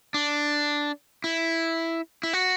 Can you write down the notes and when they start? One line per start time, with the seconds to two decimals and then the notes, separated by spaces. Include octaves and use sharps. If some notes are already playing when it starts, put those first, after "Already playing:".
0.14 D4
1.24 E4
2.23 E4
2.33 F#4